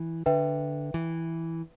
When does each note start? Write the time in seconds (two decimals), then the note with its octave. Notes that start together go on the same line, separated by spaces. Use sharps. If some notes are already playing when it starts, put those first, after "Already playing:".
Already playing: E3
0.26 D3 B4 E5 G5
0.94 E3